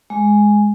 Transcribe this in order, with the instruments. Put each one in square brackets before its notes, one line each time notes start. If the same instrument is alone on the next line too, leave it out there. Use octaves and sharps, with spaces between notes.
[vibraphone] G#3